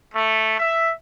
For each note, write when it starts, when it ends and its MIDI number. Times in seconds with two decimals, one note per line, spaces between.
0.14 0.55 57
0.58 0.92 76